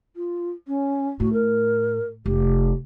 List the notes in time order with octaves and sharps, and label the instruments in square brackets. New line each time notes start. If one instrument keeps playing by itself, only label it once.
[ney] F4
C#4
[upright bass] A2 [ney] F#4
[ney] A#4
[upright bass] F1 [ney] G4